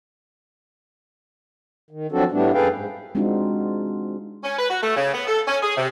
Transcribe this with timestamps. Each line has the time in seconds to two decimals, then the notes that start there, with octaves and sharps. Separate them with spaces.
1.91 D#3
2.12 F3 F#3 C4 D4 F#4 A4
2.32 A2 G3 A3 B3 D4
2.53 F#2 G#4 A4 B4 F5 G5
2.72 G#2
3.15 G#3 C4 D4 D#4 F4 F#4
4.43 C#4
4.59 B4
4.70 F#4
4.82 A3
4.96 C#3
5.14 B3
5.27 A4
5.47 C#4
5.62 G#4
5.77 C3